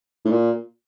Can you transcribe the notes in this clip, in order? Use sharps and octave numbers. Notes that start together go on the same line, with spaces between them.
A2
A#2